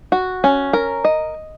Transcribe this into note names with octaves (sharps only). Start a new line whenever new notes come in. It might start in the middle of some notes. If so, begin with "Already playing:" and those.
F#4
C#4
A#4
D#5